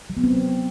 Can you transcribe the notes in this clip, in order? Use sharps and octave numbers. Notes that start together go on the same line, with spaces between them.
F#3
B3
C4